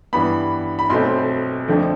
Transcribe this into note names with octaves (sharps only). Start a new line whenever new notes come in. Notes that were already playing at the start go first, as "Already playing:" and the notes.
G2 E3 B3 B5
B5
B1 B2 A3 C4 C6
F2 D3 F3 A3